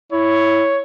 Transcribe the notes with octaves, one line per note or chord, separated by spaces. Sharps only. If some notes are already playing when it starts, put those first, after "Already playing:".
E4 C#5